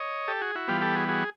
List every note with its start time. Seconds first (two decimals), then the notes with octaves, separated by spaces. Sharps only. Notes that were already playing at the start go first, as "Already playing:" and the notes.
Already playing: C#5 D#5
0.28 G4 A4
0.41 F#4 G#4
0.55 E4 F#4
0.68 E3 G3 B3 F4 G4
0.81 G4 A4
0.95 F#4 G#4
1.08 F#4 G#4